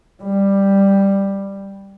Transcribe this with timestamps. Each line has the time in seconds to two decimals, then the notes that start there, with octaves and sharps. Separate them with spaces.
0.22 G3